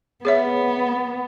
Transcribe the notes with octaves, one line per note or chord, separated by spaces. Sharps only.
B3 G#4 C#5 E5